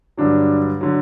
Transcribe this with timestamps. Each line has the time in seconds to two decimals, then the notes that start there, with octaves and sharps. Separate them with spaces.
0.17 G2 D3 F#3 D4
0.81 D3 F#3